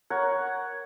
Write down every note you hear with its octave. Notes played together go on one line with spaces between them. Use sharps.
A#4 C#5 F#5